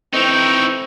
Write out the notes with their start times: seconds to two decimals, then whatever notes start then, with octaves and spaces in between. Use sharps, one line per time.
0.13 E3 A3 C4 D#4 E4 G5 C#6